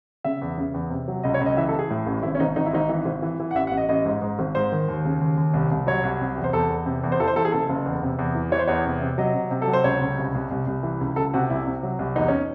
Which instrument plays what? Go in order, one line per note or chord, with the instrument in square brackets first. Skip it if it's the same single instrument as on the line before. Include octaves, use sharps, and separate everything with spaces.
[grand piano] C#3 E5
E2
C#3
E2
C3
F#3
C#2 D#5
C#5
C#2
D#5
E3 E5
A4
E3 G#4
A2
A1
G#1 E4
C#4
G#1 D#4
G#1 D#4
E4
G#1 D#4
E3
G#1
E3
E3
F#5
A1 E5
F#5
A1
D#5
A1 D#5
G#2
G#2
G#1
G#2 C5
D#3
D#2
C#3
D#2
D#2
C2
C2
F#3 C#5
C2
C3
E2
C5
E2 A4
E2
C3
E2
C5
E3 A4
C5
E3 A4
G#4
F#1 A4
F#1
E2
C3
E2
E3
E3 C#5
C5
E2 C#5
C3
C3
F#3 D#5
C3
C3
A4
F#3
C5
C#2 C#5
C#2
C2
C2
C2
C2
E3
C#2
C#2 A4
C3 F#4
C2 E4
C3
F#3
C2
E2 D#4
C#4